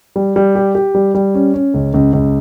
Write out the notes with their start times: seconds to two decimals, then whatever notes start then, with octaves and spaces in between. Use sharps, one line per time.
0.16 G3
0.36 G3
0.55 G4
0.75 G4
0.95 G3
1.15 G3
1.35 C#4
1.54 C#4
1.74 C#2
1.94 C#2
2.13 C#2